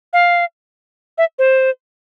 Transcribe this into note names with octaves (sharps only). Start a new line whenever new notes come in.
F5
E5
C5